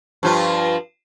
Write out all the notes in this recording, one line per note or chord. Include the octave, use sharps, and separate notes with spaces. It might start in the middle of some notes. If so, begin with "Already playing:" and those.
G2 F3 F4